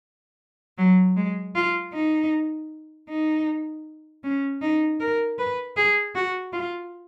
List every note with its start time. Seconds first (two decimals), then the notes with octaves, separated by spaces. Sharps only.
0.78 F#3
1.17 G#3
1.55 F4
1.93 D#4
3.09 D#4
4.24 C#4
4.62 D#4
5.00 A#4
5.39 B4
5.77 G#4
6.15 F#4
6.53 F4